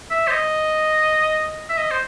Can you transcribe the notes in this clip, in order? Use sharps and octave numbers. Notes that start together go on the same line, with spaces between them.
E5
C5
D#5
E5
D#5
C5